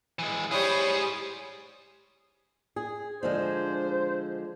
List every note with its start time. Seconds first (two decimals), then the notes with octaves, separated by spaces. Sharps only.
0.19 E3 G#3
0.51 G3 E4 G#4 C5 C#5 D#6
2.76 G#4
3.23 D3 F3 G#3 C5